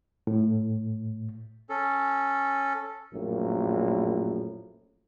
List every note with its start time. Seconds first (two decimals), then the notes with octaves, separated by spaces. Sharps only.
0.27 A2
1.69 C#4 A4
3.12 A#1 F#2 A2 A#3